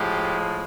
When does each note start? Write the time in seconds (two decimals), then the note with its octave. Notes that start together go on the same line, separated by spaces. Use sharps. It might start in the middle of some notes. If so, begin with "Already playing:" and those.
Already playing: A2 F3 G#3 G4